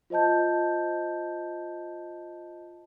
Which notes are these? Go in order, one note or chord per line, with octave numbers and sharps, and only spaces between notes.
F4 C5 D#5 A5 G6